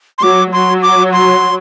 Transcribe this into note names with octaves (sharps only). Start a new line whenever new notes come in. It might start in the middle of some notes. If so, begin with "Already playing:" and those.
C6
F#3 D6
F#3 C6
D6
C6